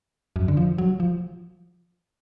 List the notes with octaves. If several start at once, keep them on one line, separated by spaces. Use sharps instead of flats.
F#2
D3
F3
F#3
F3